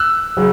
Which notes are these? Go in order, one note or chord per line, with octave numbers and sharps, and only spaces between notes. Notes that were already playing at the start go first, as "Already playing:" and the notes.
Already playing: E6 F#6
C#3 F#3